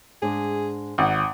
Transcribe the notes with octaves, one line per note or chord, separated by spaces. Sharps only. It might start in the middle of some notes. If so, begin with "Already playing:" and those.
G#2 G#3 D4 G#4
G#1 F#5